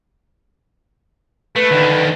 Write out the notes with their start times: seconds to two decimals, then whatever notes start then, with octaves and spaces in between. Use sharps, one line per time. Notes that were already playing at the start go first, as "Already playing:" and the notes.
1.56 A3 B4
1.71 D#2 D3